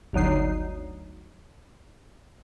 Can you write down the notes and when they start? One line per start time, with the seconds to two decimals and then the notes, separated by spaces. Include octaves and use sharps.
0.13 G1 D2 F#3 D#4 C7